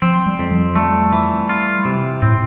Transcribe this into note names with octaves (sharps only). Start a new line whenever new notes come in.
F3 C4
G3
F2
F3
G3 A3
E3
F4
C3
A2 C4